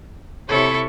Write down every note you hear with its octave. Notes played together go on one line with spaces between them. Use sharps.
C3 E4 A4 C#5 C#6